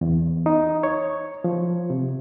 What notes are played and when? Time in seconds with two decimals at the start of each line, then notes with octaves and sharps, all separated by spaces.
0.01 E2
0.46 D#4
0.83 C#5
1.44 F3
1.90 C3